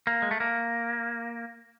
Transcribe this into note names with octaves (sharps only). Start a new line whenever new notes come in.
A#3
G#3
A3
A#3